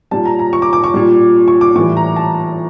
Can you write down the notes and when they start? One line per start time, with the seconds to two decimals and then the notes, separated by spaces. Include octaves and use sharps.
0.11 A#2 G3 A5
0.25 A#5
0.39 A#5
0.53 C#6
0.62 D6
0.73 D6
0.84 C#6
0.94 A#2 G3
1.48 C#6
1.61 D6
1.75 A2 E3 G3 C#6
1.97 A#5
2.16 A5